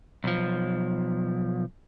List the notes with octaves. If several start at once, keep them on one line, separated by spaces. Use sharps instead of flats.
B1 F3